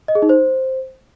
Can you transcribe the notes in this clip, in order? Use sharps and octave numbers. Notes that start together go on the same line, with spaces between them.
D#5
G#4
D#4
C5